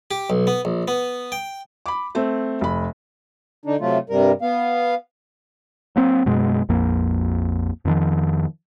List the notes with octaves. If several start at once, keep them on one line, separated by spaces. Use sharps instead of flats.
G4
B1
B3
A#1
B3
G5
B5 D6
A3 C4
F1 B5
D3 D4 D#4
C3 F#3 A3 F4
G2 C3 G3 A#4
B3 F5
F#3 A#3 C4
F#2 B2 G#3
A#1 F2 A#3
F2 D#3 F3